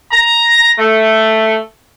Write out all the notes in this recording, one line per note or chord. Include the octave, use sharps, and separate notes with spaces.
A#5
A3